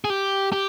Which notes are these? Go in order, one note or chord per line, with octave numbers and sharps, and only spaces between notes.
G#4
G4
G4